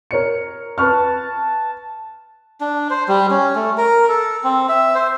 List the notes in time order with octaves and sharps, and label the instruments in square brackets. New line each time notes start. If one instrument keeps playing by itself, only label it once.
[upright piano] A#4 C#5 C#7
[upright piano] B4 C#6 F6 [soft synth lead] A5
[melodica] D4
C5
G3
C#4
A3
A#4
A4
C4
E5
C5